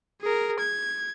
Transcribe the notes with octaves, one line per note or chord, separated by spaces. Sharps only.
G#4 A#4
G#6